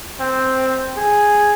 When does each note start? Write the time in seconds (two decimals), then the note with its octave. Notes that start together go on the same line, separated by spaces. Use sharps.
0.20 C4
0.97 G#4